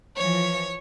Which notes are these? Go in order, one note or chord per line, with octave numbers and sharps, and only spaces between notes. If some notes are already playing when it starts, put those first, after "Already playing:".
E3 F3 C#5